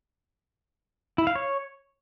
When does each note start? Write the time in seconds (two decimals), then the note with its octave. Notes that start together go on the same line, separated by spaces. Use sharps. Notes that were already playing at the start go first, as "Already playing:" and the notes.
1.18 E4
1.27 F5
1.35 C#5